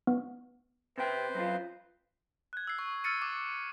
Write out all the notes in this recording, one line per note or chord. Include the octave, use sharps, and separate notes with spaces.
B3
C3 B4 C5 G5
F#2 C4 F4
F#6 G#6
E6 C7
C#6
E6 F6 A6 C#7 D#7
D6